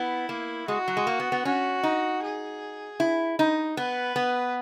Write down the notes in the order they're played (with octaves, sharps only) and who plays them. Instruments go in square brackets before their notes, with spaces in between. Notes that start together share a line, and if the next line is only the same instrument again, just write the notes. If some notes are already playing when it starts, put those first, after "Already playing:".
Already playing: [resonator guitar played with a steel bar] B3 [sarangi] E4
[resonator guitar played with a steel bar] A#3
[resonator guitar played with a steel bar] G#3 [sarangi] F#4
[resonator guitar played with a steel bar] F#3
G#3
A#3
B3
B3
[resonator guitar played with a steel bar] C#4 [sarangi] F#4
[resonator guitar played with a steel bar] D#4
[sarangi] G#4
[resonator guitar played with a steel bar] E4
D#4
[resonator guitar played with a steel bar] B3 [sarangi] B4
[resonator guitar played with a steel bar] B3